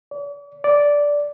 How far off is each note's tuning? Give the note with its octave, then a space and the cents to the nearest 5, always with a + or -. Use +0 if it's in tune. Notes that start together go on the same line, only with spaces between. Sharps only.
D5 -45
D5 -10